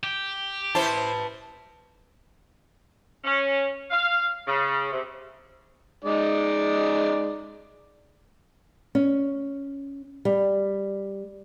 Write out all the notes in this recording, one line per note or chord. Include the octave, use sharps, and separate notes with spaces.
G4
E4 B4 C5 A5
C#4
F5
C#3
C3
G#3 D#4 D5
C#4
G3